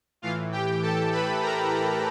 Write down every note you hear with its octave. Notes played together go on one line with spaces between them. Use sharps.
A2 E3 F4 F5
G4 G5
A4 A5
B4 B5
A#4 A#5